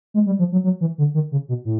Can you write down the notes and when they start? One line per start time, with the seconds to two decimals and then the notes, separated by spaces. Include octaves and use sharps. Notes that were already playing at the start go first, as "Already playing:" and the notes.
0.14 G#3
0.26 G3
0.39 F3
0.52 F#3
0.64 F#3
0.81 E3
0.98 D3
1.14 D#3
1.32 C#3
1.49 B2
1.65 A2